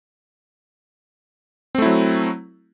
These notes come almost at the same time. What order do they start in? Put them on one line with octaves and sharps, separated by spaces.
C4 A3 E4 F#3